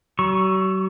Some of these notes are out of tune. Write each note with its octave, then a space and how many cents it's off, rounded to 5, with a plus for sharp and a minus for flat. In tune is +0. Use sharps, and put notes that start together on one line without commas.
F#3 +45 C#6 +0